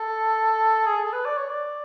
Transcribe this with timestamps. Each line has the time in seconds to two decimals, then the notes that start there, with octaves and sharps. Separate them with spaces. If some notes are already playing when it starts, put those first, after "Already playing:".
Already playing: A4
0.86 G#4
1.05 A4
1.12 B4
1.25 D5
1.37 C#5
1.49 D5